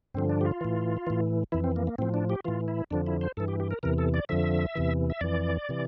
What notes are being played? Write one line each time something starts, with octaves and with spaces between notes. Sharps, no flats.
G2 D3 F3 C4
D4
G4
F4
A2 E3
A2 E3
F2 E3 E4
C4
A#3
A#3
A2 F3 C4
D4
G4
A2 E3 F4
E4
F2 D3 F3 D4
E4
C5
G2 E3 A4
G4
G4
A#4
E2 C3 E3 A#4
A4
D5
F2 D3 F3 E5
E2 C3 E3
E5
F2 E3 D5
C3 E3